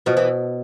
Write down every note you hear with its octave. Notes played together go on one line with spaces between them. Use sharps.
B2 F3
E3